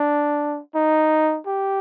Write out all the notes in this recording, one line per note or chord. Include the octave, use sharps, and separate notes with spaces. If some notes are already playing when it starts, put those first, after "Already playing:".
Already playing: D4
D#4
G4